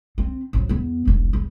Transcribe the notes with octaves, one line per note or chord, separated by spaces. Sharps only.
C4
F3 F#3
E2 B3
E1 B1
E2